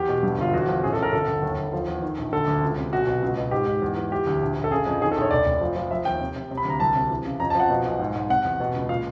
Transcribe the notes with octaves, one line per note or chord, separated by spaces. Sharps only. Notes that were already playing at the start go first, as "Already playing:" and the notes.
Already playing: E2 G4
B2
G2
G1 F4
E2 F#4
F3
A1 G#4
A4
A1 A#4
G1 A4
G1
D#2
D#2
F3
E2
D#3
A#1
D3 A4
D2
C#2
C3
B1 F#4
B2
C#2
B2
G#2 G4
G#2
E2
E3
E3 G4
D2
A#1
A#1
A4
C#3 G#4
F2
D#3 G#4
A4
A#1
C#5
F1 D5
F1
F3
F3
F3 E5
D#2 G5
C3
C3
C3
B5
D2 A#5
C2 A5
C3
E3
C#3
F2 A#5
A5
F3 F#5
B2
B1
G#2
G#2
C3 F#5
E2
B2
C#2
A#2 F5